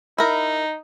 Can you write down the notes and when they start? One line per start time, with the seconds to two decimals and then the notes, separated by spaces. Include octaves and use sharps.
0.18 D#4 E4 A#4